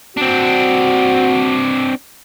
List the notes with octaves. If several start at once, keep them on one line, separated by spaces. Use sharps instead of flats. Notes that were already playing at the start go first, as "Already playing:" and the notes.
C4 D4 F#4